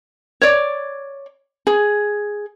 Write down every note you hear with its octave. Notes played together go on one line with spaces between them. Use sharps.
C#5 D5
G#4